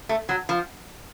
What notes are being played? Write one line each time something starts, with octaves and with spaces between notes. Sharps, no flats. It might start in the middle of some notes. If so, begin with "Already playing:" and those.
A3
F#3
F3